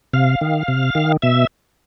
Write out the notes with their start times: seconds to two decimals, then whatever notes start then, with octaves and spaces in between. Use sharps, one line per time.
0.13 C3 F5
0.41 D#3
0.68 C3
0.95 D#3
1.22 B2 E5